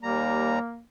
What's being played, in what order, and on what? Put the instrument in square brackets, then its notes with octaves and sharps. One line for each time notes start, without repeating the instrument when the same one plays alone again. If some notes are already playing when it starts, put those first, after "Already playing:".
[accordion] D#2 G3 A#5 [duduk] A#3